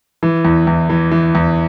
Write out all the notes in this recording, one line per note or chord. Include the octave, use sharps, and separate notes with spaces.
E3
E2
E2
E3
E3
E2